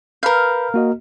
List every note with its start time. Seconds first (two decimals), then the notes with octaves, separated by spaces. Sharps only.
0.23 A#4 B4 F5 B5 G6
0.74 A#3 F#4 D#5